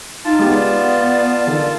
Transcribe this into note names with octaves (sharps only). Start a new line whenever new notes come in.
D#4 F4 A5
G#3 B3 G4
D5
D3 D#3 A4